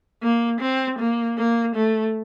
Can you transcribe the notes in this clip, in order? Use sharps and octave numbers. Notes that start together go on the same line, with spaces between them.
A#3
C4
A#3
A#3
A3